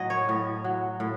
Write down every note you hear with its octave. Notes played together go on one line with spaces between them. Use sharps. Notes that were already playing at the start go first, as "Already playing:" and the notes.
Already playing: A2 F#3 D#5
C#5
A2
F#3
A2